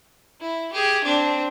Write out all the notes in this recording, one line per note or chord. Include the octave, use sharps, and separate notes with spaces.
E4
G4 G#4
C4 D4